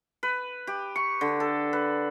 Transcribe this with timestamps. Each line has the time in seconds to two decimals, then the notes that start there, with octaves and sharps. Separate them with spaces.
0.23 B4
0.67 G4
0.96 C#6
1.21 D3
1.40 A4
1.73 B4